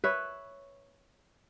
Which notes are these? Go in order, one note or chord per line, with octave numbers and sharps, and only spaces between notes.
B4 C#5 E5